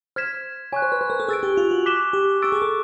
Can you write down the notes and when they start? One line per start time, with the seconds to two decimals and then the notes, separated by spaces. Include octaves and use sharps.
0.16 C5 F6 G#6 B6 E7
0.72 C#5 G#5 C#6 F#6
0.82 C5
0.92 B4
1.01 C5
1.10 A#4
1.20 A4
1.28 G#4 E6 A6 D7
1.43 G4
1.57 F4
1.71 F#4
1.86 D6 F#6 B6 E7 G7
2.13 G4
2.42 G4 C#6 E6 A6 D7
2.52 G#4
2.62 A4